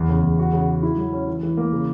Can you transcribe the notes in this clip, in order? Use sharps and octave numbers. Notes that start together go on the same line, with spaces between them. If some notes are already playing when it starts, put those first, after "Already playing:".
Already playing: E2
C#3
E2
F#4
C#3
F#4
E4
F#3
C#4
E3
E3
A#3
C#3